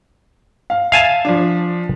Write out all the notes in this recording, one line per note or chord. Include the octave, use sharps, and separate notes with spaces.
F5
E5 F5 G#5 A5
F3 D4